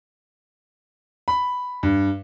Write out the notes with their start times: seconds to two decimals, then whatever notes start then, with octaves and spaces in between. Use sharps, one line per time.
1.28 B5
1.83 G2